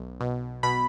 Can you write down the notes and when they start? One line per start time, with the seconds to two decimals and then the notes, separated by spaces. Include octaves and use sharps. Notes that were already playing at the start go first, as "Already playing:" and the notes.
Already playing: B1
0.21 B2
0.63 B2 B5